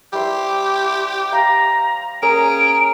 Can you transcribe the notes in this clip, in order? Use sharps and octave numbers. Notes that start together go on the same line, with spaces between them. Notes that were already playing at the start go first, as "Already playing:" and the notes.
G3 E4 G4 C5
F5 A#5
A#3 C#4 G#4 A#4 D7